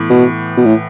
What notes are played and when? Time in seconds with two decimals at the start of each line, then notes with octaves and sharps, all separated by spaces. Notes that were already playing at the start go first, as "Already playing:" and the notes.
Already playing: A2 E3 B3
0.10 B2
0.57 B2
0.65 A2